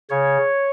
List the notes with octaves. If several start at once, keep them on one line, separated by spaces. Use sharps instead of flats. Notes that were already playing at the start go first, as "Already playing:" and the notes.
C#3 C#5